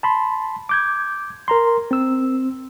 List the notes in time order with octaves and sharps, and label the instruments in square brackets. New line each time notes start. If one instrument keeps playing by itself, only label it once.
[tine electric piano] A5 B5 C6
D6 G6 G#6
A#4 A#5 C6
C4 E6